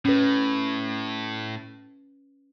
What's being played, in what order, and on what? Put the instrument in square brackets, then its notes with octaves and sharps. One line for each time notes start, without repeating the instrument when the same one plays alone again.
[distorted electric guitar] A2 [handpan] C#4 B4